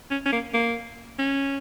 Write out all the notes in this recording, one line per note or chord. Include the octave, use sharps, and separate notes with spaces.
C#4
C#4
A#3
A#3
C#4